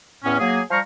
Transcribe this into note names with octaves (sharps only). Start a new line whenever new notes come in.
E2 A2 B3 C#4
F#3 A#3 G#4
F3 G3 C5 A#5 C#6 F6